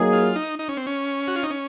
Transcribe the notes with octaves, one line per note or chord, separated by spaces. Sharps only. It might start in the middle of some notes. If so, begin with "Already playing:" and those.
Already playing: F#3 A#3 D#4 G#4
F4
D#4
D#4
C#4
C4
C#4
F#4
F4
D#4
C#4